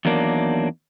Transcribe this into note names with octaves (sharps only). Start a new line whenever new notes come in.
E2 D#3 F#3 A#3 D4